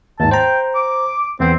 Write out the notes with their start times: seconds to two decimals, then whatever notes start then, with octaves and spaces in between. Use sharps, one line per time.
0.20 D#2 G#2 A5
0.31 C5 G5 A#5
0.75 D6
1.40 E2 B3 C4